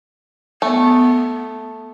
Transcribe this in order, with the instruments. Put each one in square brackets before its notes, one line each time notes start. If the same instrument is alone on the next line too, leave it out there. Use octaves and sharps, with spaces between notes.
[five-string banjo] A3 [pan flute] B3